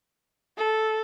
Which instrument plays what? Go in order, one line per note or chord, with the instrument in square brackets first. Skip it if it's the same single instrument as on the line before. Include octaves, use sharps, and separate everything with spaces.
[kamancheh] A4